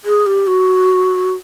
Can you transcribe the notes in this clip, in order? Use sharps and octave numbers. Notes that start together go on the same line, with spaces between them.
G#4
G4
F#4